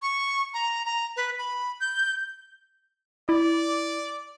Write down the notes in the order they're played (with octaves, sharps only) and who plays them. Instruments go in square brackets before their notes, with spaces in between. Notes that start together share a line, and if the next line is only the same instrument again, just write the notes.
[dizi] C#6
A#5
A#5
B4
B5
G6
[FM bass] E4 [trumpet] D5